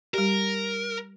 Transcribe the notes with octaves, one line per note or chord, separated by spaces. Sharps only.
G3 G4 A#4